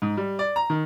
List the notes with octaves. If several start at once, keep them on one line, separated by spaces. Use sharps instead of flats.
G#2
G3
D5
A#5
D#3